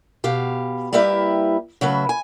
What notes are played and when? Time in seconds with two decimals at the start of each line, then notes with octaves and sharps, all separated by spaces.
0.24 B2 G4 F5
0.93 G3 A#3 E4 G4 B4 E5
1.81 C#3 F#3 A3 B4
2.09 G#5